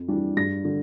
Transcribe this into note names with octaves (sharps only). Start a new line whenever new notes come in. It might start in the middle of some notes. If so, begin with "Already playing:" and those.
Already playing: F2
E3 G3 D4
G2 A#6
D3